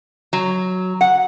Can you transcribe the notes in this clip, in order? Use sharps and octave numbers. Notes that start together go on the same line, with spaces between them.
F#3
F#5